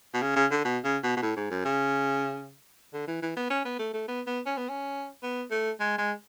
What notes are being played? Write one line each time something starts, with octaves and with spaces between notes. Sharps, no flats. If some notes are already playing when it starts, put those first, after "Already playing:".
B2
C#3
C#3
D3
B2
C#3
B2
B2
A2
G#2
F#2
C#3
D3
E3
E3
B3
C#4
B3
A3
A3
B3
B3
C#4
B3
C#4
B3
A3
G#3
G#3